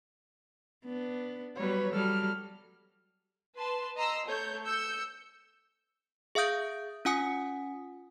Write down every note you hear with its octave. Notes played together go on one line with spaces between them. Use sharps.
B3 D4
F#3 G3 B3 B4 C#5
F#3 G3 A4 F6
B4 A5 C6
D#5 A#5 C6 E6 A#6 C7
A3 C#5 G6
E6 G6 C#7
G#4 E5 F5 D#6 G6 D7
C#4 F4 F#5 G#5 D#6 C#7